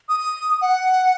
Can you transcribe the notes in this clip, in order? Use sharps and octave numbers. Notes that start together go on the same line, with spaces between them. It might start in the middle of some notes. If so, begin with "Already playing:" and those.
D#6
F#5